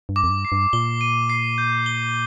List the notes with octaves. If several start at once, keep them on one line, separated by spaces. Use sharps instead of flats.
G2
D6
F2
G2
C7
G2
A#2 G7
D#7
C7
G6
G7